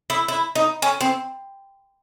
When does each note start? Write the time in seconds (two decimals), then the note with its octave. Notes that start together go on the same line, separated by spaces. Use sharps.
0.10 E4
0.28 E4
0.55 D#4
0.82 C#4
1.01 C4